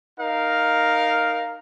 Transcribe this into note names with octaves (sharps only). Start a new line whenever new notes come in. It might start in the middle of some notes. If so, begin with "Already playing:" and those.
D#4 A#4 F5